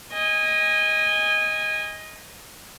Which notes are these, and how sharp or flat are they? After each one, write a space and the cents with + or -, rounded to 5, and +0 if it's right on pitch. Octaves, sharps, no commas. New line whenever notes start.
D#5 +15 G#5 -25